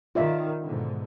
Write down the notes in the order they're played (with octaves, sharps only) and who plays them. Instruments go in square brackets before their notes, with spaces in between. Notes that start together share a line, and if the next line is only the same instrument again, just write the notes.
[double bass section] D#3 [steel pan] F4 D5 E5
[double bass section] G#2 B2 D3